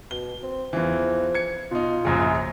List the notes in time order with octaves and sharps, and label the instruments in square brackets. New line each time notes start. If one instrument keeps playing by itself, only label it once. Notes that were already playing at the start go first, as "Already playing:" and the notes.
[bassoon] B2 [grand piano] G7
[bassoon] C4
[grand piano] E2 E3 [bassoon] F3
[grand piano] G#6 C#7
[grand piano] B2 D#4 [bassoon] F4
[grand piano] A#1 F#2 C#3